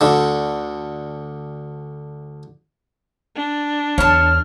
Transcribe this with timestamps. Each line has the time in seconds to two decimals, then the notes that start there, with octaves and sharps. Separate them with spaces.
0.01 D2 D3
3.36 D4
3.98 E2 C#5 A5 F6